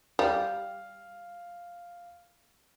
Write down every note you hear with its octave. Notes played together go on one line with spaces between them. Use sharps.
G3 F5